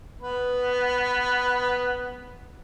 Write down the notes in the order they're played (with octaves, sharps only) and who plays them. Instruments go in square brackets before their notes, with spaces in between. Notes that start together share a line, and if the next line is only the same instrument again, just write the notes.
[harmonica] B3 B4